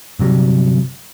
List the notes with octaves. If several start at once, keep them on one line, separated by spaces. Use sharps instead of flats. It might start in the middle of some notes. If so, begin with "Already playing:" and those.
G1 C3 F#3 G3